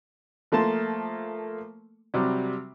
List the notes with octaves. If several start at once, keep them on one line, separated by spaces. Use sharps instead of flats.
F3 A3 A#3 A5 C6
C3 F#3 G3